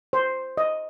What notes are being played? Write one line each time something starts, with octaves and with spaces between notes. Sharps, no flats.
C5
D#5